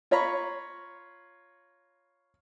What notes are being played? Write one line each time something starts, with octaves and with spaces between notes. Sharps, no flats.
F4 C#5 A#5 B5 C#6